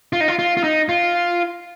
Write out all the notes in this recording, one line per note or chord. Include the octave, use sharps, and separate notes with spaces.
F4
D#4
F4
F4
F4
D#4
F4